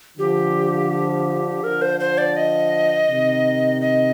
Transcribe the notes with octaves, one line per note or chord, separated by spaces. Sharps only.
D3 F3 G4
D3 F3 A#4
C5
C5
D5
D#5
C3 D#3
D#5